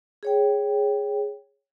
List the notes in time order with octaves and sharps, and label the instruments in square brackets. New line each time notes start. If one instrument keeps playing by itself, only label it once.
[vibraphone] G#4 C#5 G5